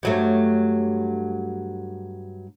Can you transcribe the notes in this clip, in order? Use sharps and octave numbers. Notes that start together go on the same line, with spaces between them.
G2 F#3 A3